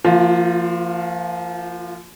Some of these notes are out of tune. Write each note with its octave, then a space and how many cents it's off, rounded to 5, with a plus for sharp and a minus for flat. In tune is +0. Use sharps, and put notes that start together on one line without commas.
F3 -25 A#3 -35 F4 +30